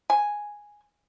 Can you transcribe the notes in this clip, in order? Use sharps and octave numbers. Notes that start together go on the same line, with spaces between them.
G#5